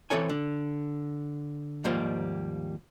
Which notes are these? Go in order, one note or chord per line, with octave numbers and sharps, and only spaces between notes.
E3 F#3 C4 A4 C#5 G#5
D3
D#2 G#2 F3 G3 A#3 C5